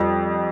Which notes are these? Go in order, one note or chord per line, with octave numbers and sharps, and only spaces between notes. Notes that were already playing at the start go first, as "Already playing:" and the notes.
Already playing: F2 G3